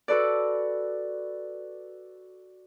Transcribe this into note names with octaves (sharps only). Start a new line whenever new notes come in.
F#4 A4 B4 D5